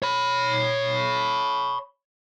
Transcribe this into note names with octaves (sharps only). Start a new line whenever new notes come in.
C#5 B5